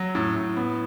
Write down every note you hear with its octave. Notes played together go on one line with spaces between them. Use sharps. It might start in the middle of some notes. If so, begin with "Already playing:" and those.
Already playing: F#3
A2
A2
B3